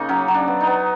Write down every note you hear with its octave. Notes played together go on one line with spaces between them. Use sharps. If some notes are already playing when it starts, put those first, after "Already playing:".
Already playing: C#3 A#3 D#4
F#3 C#4
F#3
D4
B3
D#4
B3